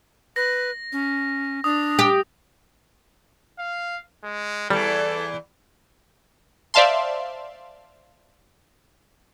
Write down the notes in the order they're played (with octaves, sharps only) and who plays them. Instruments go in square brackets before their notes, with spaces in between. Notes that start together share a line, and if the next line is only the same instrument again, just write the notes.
[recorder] B4 [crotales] A#6
[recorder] C#4
[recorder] D4 [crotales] D#6
[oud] G4
[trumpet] F5
G#3
[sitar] E2 E3 [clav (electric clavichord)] G3 [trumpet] A4
[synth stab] C5 D5 E5 F5 A5 C6